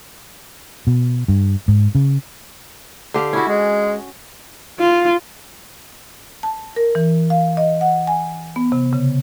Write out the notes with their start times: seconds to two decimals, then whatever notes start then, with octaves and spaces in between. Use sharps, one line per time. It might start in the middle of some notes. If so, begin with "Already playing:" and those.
0.87 B2
1.28 G2
1.68 G#2
1.95 C#3
3.14 D3 G4 F5
3.33 C#4 E4 F#4
3.48 G#3
4.80 F4
6.43 A5
6.76 A#4
6.95 E3
7.30 F5
7.57 D#5
7.81 F#5
8.07 G#5
8.56 B3
8.72 C3
8.93 C#3